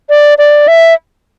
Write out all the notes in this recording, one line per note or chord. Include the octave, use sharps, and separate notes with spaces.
D5
D5
E5